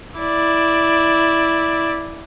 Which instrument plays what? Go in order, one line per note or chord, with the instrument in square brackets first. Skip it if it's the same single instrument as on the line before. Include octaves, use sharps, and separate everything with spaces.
[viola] E4 D5